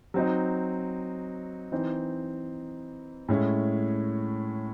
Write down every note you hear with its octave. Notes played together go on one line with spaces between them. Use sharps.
F#3 C4 D#4
E3 C4 D#4
A2 G#3 C#4 E4